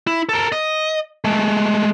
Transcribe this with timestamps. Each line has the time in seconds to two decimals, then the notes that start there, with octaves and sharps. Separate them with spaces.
0.07 E4
0.29 A4 A#4
0.52 D#5
1.24 G#3 A3